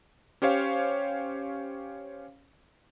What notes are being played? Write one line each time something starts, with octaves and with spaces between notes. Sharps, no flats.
C#4 G4 C5 C#5 F5